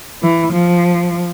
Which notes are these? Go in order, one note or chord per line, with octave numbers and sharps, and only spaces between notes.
E3
F3